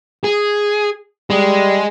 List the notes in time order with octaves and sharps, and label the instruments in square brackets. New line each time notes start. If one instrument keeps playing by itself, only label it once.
[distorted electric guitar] G#4
[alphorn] G3 [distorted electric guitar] G#3